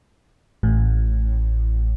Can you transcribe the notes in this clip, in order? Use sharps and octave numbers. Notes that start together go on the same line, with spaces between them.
A1 A2